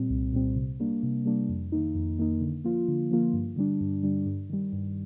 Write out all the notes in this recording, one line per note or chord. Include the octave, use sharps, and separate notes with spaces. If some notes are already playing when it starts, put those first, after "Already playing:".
Already playing: A#2 G3 C4
C2
A#2 G3 C4
C3
G3 A#3 D4
C3
G3 A#3 D4
F2
D#3 A#3 D#4
F2
D#3 A#3 D#4
D3
F3 A#3 F4
D3
F3 A#3 F4
G2
D3 G3 D4
G2
D3 G3 D4
G2
D#3 G3
G2